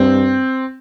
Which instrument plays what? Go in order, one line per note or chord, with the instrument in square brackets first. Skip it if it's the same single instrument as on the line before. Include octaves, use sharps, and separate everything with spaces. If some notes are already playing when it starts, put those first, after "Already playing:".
Already playing: [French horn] G2 [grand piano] C4